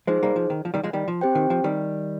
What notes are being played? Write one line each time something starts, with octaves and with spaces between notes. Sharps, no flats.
F3 G#3 D#4 G#4 C5
G3 A#3
F3
D#3
F3
D#3 G3
F3 G#3
D#3 G3
F3
C4 G4 C5 G5
D#3
F3
D#3 G3